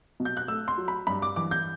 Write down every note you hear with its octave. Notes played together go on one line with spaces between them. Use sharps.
B2
G6
F#6
A3 E6
C6
F#3
B5
G2 B5
D6
E3 D6
G6